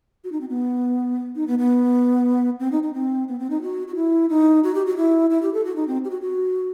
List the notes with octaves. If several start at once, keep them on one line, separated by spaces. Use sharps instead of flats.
F#4
D#4
C4
B3
D#4
B3
B3
C4
D#4
D#4
C4
B3
C4
D#4
F#4
F#4
E4
D#4
F#4
G4
F#4
E4
E4
G4
A4
F#4
D#4
C4
G4
F#4
F#4